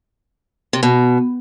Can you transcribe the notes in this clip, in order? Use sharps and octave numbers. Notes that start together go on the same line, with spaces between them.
C3
B2